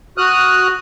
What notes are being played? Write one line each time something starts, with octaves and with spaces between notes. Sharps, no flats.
F#4 D#6 F6 F#6